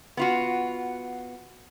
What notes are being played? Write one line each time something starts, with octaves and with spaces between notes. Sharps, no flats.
B3 F4 F#4